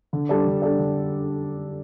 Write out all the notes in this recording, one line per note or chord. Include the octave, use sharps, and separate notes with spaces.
D3
G3 D4 A4 D5
D3
G3 D4 A4 D5
D3